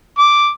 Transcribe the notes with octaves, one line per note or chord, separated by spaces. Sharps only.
D6